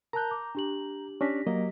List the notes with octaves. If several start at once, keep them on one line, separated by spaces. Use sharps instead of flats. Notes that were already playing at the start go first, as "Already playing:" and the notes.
A#4 A5 A#5 F#6 G6
D6
D4 G4 F#7
C#4 D4 G4 A#6 B6
F#3 A#3 D#5